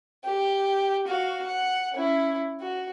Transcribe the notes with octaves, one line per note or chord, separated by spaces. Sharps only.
G4
F#4 F5
F#5
C#4 E4
F#4